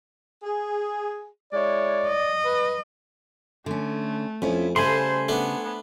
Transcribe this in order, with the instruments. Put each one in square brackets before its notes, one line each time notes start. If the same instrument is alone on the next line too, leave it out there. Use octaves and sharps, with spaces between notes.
[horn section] G#4
[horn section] G#3 E4 C#5 [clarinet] D5
[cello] D#5
[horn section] B4
[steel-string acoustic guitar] D3 C#4 [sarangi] A3
[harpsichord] F2 [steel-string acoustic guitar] F3 C#4 E4
[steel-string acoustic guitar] C#3 G3 A4 [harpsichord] A3 [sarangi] C5 [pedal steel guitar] G#5 B5 C6
[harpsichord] A3 D4 [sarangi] B3